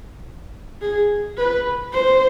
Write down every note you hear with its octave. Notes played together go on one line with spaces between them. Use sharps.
G#4
B4
C5